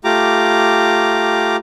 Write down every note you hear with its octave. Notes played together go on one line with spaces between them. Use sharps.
A3 F4 G4 A#5 D6